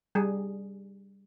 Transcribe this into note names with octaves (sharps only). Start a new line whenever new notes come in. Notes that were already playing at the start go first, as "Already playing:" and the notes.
G3 G#4